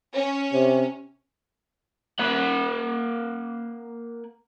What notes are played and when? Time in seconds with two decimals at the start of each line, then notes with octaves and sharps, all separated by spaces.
0.14 C#4
0.52 C3
2.19 A#3 F#5